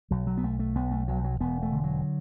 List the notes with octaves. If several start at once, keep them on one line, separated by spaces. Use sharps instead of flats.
B1 F#3
F#3
B3
B1 A3
A3
B1 B3
A3
B1 F#3
F#3
E1 B3
A3
D3
F#3